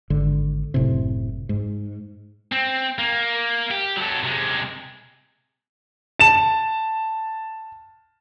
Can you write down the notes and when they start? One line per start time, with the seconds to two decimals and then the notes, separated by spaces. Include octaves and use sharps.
0.10 G#1 D3
0.74 F#1 A2 C3
1.49 G#2
2.52 C4
2.99 A#3
3.71 G4
3.96 F#3 A4
4.23 C3 G#3
6.19 A5 E7